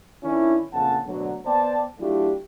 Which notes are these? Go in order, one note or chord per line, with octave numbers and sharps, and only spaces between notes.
D#3 C#4 D4 E4
A#1 F2 C#3 F#5 A5
D2 B2 D3 F#3
B3 C5 D5 G5 A5
F#3 A3 D4 E4 F4 G4